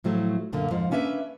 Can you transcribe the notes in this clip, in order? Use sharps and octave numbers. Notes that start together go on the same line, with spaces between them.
A2 F3 F#3 A3
F#2 A#2 D3 A#3
F2 G#2 F3
A#3 C#4 D4 B4 E5